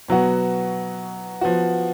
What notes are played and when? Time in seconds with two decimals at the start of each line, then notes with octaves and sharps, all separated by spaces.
0.08 B2 F#3 B3 F#4
1.41 F3 B3 F#4